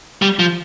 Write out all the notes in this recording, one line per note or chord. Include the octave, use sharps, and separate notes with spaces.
G3
F3